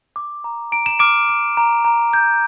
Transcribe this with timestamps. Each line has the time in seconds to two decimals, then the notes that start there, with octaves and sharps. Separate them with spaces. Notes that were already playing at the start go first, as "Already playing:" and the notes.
0.16 D6
0.44 A#5
0.72 A#5 D7
0.86 E7
0.99 D6 F6 D7
1.29 D6
1.57 A#5
1.85 A#5
2.13 G6